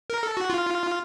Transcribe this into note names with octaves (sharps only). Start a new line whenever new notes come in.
A#4
A4
F#4
F4